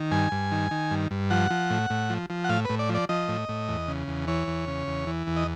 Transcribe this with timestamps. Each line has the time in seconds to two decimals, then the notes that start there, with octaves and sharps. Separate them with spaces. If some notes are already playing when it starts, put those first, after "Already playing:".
Already playing: D#3
0.11 G2 G#5
0.32 G2
0.51 D#3
0.71 D#3
0.91 G2
1.11 G2
1.30 F3 F#5
1.50 F3
1.70 A2
1.90 A2
2.10 F3
2.30 F3
2.44 F#5
2.49 A2 F5
2.65 A2 B4
2.79 D5
2.89 F3
2.94 D5
3.09 F3 D#5
3.29 A2
3.49 A2
3.68 E2
3.88 C#3
4.08 E2
4.28 E3 C#5
4.48 E2
4.68 C#3
4.88 E2
5.07 E3
5.27 E2
5.37 D#5